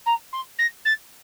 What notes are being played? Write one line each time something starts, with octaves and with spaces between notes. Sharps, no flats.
A#5
C6
A#6
A6